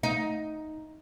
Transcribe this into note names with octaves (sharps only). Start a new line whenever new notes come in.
D#4